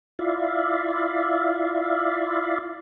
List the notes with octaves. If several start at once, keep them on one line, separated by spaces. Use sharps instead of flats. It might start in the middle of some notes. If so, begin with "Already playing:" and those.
E4 F4 D5 E5 F5